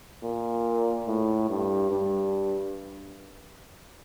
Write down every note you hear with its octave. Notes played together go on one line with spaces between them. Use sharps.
A#2
A2
G2
G2